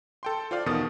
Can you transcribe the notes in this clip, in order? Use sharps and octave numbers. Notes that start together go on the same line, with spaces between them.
A4 G5 C6
F4 C5 D5 F5
E2 B2 D#3 A4 D#6 A6